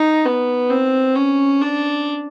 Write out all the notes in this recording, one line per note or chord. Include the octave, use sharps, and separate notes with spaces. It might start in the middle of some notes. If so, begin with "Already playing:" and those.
Already playing: D#4
B3
C4
C#4
D4